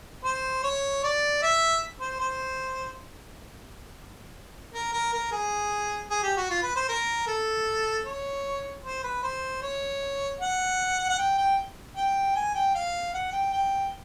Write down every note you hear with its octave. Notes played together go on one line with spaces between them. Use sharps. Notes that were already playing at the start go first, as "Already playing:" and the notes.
C5
C#5
D5
E5
C5
C5
A#4
A#4
A#4
G#4
G#4
G4
F#4
F4
B4
C5
A#4
A4
C#5
C5
B4
C5
C#5
F#5
F#5
G5
G5
G5
G#5
G5
F5
F#5
G5
G5